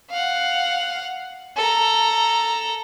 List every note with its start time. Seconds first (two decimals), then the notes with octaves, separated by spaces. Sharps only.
0.11 F5 F#5
1.57 A4 A#5